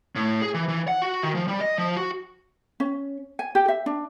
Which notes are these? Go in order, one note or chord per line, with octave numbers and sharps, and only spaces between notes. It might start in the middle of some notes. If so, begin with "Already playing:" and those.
A2
G#4
E3
E3
F#5
F#4
D#3
F3
G3
D#5
F3
F#4
C#4
G#5
G4
E5
D4